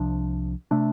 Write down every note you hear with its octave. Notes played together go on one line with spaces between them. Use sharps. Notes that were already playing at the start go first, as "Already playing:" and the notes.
Already playing: C2 C3 F3 D4
C3 A3 D4